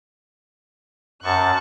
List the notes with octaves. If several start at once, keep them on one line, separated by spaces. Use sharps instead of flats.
F#2 A5 C#6 F#6